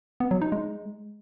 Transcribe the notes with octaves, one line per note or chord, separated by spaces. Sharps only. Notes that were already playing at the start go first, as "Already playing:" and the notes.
B3
F#3
D#4
G#3